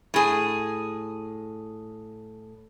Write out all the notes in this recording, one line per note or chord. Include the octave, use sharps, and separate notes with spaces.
A2 G#4